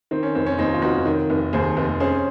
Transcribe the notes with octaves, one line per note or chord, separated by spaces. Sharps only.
D#3 C4
C#4
F1 C4
C#4
D#2 C4 D#4
F4
F1 D#4 F#4
D#3
F1
D#2 G#4 C5
F1
C#4 G#4 C5